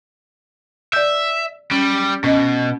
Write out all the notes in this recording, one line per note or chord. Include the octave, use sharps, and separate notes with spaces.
D5 E5 G6
G3 C#4
B2 C#4 D#5